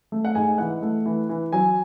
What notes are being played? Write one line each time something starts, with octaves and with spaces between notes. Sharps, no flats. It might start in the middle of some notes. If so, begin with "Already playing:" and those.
A3
F#5
G#2 G#5
E3 F#5
A3
E3
E3
F#3 G#5